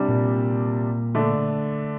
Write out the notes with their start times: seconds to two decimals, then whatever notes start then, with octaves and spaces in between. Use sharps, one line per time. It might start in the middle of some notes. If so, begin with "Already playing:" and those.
Already playing: C3 G3 D4
0.08 A#2
1.15 D3 A3 D4